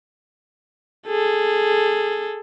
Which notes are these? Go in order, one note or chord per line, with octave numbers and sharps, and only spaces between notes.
G#4 A4